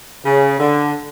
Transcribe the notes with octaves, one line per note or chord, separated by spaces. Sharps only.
C#3
D3